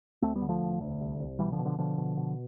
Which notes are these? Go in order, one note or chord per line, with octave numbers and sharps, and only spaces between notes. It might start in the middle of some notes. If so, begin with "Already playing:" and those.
D2 A3 C4
G3 B3
D3
F3 A3
E1
D2
C2
C2
B2 E3 G3
D3 F3
B2
D3 F3
B2 D3 F3
B2
B2